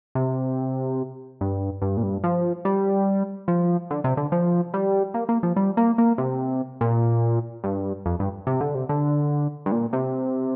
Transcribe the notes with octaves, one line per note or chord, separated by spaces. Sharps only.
C3
G2
G2
A#2
G2
F3
G3
F3
D3
C3
D3
F3
G3
A#3
A#3
F3
G3
A#3
A#3
C3
A#2
G2
F2
G2
C3
D3
C3
D3
G2
A#2
C3